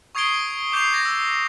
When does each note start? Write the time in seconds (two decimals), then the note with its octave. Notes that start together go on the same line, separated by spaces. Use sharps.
0.15 C#6 D#6 G#6 C7 D7 G7
0.72 D6 G6 C7 E7 F7
0.94 G#6 A#6
1.05 E6